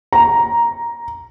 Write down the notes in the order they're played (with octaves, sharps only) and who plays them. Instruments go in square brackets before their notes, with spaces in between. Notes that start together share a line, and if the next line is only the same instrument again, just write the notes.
[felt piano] A#5